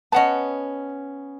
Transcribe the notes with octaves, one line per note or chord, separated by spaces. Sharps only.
B3 C#4 D#5 F#5 A5